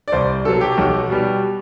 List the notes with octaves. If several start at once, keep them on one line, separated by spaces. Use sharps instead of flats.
D5
C2 C5
B2 F#3 A4
G4
B1 F#4
B2 G3